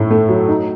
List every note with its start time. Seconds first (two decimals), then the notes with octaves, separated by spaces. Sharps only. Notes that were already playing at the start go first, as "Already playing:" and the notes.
Already playing: A2 E4
0.11 A3
0.29 F#3
0.48 D#4